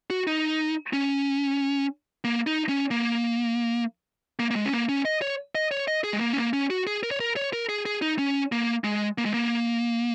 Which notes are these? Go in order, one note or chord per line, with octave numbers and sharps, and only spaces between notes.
F#4
D#4
C#4
A#3
D#4
C#4
A#3
A#3
A#3
G#3
C#4
A#3
C#4
D#5
C#5
D#5
C#5
D#5
G#4
G#3
A#3
C#4
A#3
C#4
F#4
G#4
A#4
C#5
A#4
C#5
A#4
G#4
G#4
D#4
C#4
A#3
G#3
A#3
G#3
A#3